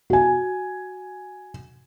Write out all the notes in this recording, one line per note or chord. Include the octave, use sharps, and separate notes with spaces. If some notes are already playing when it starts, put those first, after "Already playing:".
F#4 G#5